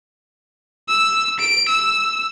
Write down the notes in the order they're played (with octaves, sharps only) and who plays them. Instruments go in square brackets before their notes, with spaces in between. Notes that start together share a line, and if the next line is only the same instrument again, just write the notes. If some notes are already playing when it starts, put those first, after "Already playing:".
[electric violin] E6
D7
E6